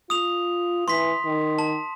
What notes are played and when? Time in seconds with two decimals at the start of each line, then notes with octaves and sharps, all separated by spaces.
0.10 F4 D#6 F7
0.88 E3 C6 B6
1.25 D#3
1.59 A5